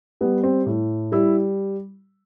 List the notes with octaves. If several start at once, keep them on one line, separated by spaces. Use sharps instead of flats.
G3 B3
C4
A2
G3 E4